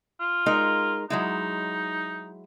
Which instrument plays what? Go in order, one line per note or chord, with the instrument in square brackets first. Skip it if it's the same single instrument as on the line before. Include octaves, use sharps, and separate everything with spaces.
[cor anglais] F4
[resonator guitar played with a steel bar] G#3 D#4 A#4
[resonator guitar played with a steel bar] F#3 G#3 E4 [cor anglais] D#4